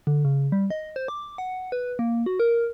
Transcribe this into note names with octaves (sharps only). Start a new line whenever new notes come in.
D3
C#3
G3
D#5
C5
D6
F#5
B4
A#3
F#4
A#4